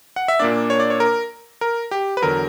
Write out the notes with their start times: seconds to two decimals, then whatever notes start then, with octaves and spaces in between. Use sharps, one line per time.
0.16 F#5
0.28 E5
0.40 A#2 A#3 D4 D5
0.70 C#5
0.80 D5
0.90 C#5
1.00 A#4
1.61 A#4
1.91 G4
2.17 B4
2.22 E2 D3 F#3 A#4